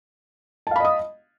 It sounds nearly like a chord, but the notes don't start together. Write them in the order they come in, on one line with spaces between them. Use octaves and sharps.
A5 F5 B5 D#5 D#6